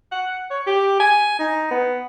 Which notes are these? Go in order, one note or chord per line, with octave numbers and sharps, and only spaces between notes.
F#5
C#5
G4
G#5
D#4
B3